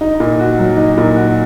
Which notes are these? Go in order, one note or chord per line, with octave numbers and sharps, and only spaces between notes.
D#4
A#2
F#4
F#3
D#4
A#2
F#4